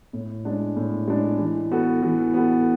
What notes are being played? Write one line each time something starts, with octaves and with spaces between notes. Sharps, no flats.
A2
G#3 D4
A2
G#3 D4
E3
B3 F#4 A4
E3
B3 F#4 A4